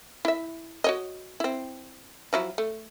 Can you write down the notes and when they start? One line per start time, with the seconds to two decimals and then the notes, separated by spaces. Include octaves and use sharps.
0.25 E4 E5
0.84 F#4 C#5 D#5
1.40 C4 E4
2.33 F3 F#3 E4
2.58 A3